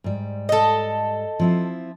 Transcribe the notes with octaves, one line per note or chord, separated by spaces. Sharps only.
G#2 G3
A4 D#5
F3 C4 E4